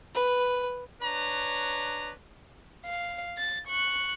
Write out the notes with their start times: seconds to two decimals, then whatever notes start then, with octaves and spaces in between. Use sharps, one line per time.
0.15 B4
1.01 D4 B4 C#5 A#5
2.85 F5
3.38 A6
3.68 C#6 F#6